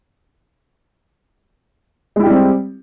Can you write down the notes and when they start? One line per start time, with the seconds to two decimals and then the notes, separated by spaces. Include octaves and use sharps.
2.16 G#3
2.20 E4
2.23 G4
2.27 G3
2.30 C4